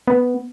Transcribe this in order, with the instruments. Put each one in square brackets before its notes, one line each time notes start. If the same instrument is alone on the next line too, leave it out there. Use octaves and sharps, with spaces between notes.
[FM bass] B3